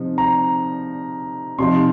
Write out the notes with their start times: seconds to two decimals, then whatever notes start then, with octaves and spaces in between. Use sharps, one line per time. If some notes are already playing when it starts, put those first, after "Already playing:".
Already playing: C3 F3 D#4
0.18 A#5
1.58 C3 F3 D#4 C6